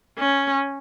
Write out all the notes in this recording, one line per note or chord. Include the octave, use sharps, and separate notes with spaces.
C#4